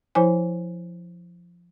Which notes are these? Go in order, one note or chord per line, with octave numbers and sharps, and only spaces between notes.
F3 E4 C5 G#5